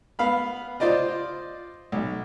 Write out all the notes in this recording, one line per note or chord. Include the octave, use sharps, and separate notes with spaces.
B3 F5 B5
F4 C5 D5 D#5
B1